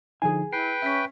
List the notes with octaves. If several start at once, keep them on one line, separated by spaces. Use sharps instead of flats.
D3 F3 D#4 G#4 G#5
E4 B4 G5 C7
C#4 E5 B6